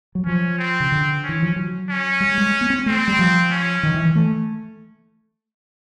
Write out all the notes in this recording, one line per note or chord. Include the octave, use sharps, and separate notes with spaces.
F#3
F3 C#4
C4
C#3
D3
C#4
E3
F3
F#3
C#4
G3
G#3
B3
C4
A3 C4
G3
F3
C#4
D#3
E3
E3
A3